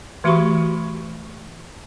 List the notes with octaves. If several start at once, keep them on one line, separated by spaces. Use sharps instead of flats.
E3 A3 F#4 G4 B5 C#6